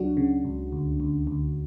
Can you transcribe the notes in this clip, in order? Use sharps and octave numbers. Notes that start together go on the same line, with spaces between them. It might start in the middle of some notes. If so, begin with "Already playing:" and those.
Already playing: C#2 F#3 D4 F#4
C#3
C#2
D2
D2
D2